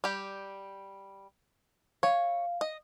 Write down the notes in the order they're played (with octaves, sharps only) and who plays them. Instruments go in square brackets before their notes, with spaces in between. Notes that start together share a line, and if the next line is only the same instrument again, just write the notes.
[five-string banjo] G3 G4
[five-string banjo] C#5 [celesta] F5
[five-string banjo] D#5